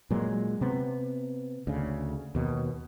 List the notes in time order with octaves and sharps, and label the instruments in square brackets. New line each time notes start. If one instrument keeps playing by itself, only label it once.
[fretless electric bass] A#2 F#3 G#3
C3 B3
D2 C#3
D#2 B2